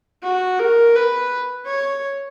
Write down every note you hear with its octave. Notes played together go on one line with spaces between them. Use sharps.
F#4
A#4
B4
C#5